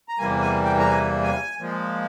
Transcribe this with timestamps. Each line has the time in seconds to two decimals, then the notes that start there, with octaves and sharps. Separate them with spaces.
0.09 A#5
0.19 E2 C3 E3 G3 A#3 G#5
0.42 G#5
0.65 G5
0.79 A#5
0.89 G#5
1.23 G#5
1.58 A#2 F3 G#3